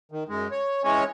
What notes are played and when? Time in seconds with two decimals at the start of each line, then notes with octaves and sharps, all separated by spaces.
0.12 D#3
0.29 F#2 G#3
0.51 C#5
0.84 E3 G#3 C#4 C#5